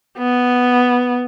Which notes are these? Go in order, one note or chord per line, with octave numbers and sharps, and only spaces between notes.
B3